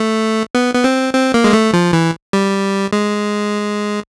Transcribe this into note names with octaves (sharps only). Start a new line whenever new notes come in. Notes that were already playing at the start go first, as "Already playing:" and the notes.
Already playing: A3
B3
B3
C4
C4
A#3
G#3
A3
F3
E3
G3
G#3